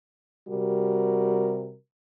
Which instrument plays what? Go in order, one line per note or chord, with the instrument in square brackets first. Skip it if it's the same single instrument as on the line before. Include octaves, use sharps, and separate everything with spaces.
[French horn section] C3 G3 F#4 A#4